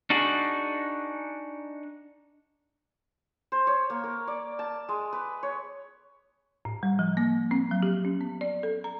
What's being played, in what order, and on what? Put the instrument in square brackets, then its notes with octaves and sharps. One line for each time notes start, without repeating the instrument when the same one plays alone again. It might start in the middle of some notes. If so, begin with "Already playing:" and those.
[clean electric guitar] D4 D#4 F#4 G#4
[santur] C5
C#5
A#3
A#4
D5
A5
G#3
B4
C#5
[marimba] A2
G3
F3
A#3
C4
F#3
G4
C#4
B3
D5
A4
A#5